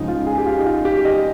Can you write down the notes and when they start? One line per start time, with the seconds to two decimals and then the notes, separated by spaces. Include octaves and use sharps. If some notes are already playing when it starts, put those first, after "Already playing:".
Already playing: C#2 C#3 F3 D#4
0.08 F4
0.27 G#4
0.38 G4
0.46 F4
0.59 D#4
0.66 F4
0.85 G4
1.05 D#5